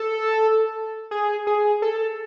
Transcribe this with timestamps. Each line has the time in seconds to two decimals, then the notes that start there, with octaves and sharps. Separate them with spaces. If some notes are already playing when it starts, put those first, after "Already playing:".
Already playing: A4
1.11 G#4
1.47 G#4
1.82 A4